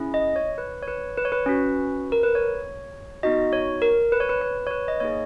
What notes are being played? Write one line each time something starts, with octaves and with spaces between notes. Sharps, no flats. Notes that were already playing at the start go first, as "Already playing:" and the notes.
Already playing: C#4 E4 G#4
D#5
C#5
B4
C#5
B4
B4
C#5
B4
C#4 F#4
A#4
B4
C#5
B3 D#4 F#4 D#5
C#5
A#4
B4
C#5
B4
B4
C#5
B4
D#5
A#3 D#4 G#4 C#5